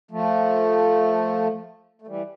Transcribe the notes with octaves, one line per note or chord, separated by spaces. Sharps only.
F3 A3
A3
E3 G3